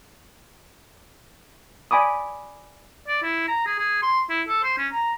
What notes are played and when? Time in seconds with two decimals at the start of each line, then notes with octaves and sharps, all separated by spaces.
1.91 D5 G#5 B5 D6 D#6
3.08 D5
3.23 E4
3.48 A#5
3.66 G#4
3.79 G#4
4.02 C6
4.30 E4
4.48 A4
4.64 C5
4.78 C#4
4.93 A#5